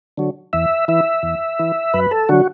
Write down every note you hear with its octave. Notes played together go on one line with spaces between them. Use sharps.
D3 F#3
E2 E5
E3 E5
E2
E3
F#2 B4
A4
D3 F#3 F#4